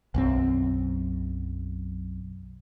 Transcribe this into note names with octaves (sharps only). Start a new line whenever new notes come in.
B1 F#2 C4